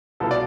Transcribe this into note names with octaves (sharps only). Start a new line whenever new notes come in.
C2 B2 B3 F4 A4
D5